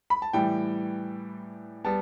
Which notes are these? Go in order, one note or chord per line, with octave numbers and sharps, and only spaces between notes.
B5
A5
A2 E3 G3 G5
G3 B3 A5